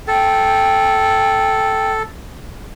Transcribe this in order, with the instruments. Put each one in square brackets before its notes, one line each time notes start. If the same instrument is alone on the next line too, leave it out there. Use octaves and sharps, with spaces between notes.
[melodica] A4 [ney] G5